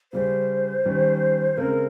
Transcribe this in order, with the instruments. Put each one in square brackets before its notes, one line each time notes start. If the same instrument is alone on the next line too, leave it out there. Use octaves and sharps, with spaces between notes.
[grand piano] C#3 G3 C#4 [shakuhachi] C5
[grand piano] D#3 G3 C#4
[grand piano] C#3 G#3 C4 [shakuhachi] A#4